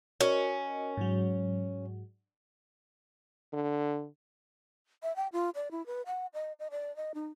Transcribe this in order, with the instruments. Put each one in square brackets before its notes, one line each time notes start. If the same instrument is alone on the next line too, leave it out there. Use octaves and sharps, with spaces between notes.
[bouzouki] C#4 [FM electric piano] F#4 A#4 D#5
[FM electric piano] G#2 F#3
[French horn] D3
[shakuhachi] E5
G5
F4
D5
E4
B4
F#5
D#5
D#5
D5
D#5
D#4